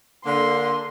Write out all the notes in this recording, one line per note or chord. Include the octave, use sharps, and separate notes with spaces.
D3 A#3 C6